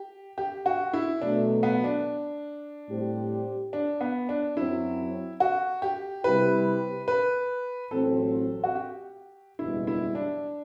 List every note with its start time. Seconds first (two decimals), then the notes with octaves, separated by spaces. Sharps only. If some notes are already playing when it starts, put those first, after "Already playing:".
Already playing: G4
0.38 G4
0.66 F#4
0.93 E4
1.21 B2 F#3 A3 D4
1.63 B3
1.84 D4
2.89 A2 G3 C4 G4 C5
3.73 D4
4.01 B3
4.29 D4
4.56 F#2 F#3 C4 E4
5.40 F#4
5.82 G4
6.24 C3 G3 C4 E4 G4 B4
7.08 B4
7.91 A1 A2 F#3 C4 A4
8.64 F#4
8.75 G4
9.59 F#1 E2 B2 G3 E4
9.87 E4
10.15 D4